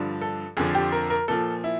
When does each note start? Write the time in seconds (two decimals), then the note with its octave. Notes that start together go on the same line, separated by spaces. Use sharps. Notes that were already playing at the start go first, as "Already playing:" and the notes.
Already playing: G2 D3 F3
0.21 A4
0.57 F2 D3 F3 G#4
0.75 G4
0.92 A#4
1.10 A#4
1.28 A#2 F3 A4
1.64 E4